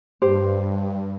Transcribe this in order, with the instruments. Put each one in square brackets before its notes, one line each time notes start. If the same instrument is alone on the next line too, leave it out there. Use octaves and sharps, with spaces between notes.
[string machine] G2 [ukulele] G4 C5